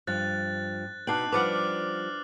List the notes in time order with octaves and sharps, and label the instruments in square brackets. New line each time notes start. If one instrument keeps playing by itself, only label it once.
[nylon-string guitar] G2 F3 [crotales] F#6 A6
[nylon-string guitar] B2 B3 [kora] D4 D#4 G5 [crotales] F#6 C7 F#7
[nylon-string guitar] F3 G3 [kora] B4 D5 F#5 [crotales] D6 F6